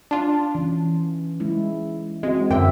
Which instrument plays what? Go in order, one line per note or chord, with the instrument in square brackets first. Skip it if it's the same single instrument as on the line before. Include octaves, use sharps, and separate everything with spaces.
[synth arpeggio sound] D4 F4
[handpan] E3 C#4
G#3 E4
[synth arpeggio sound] G#3 [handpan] C4 F#4
[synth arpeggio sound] F#2 D3 G5 [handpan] A#4 E5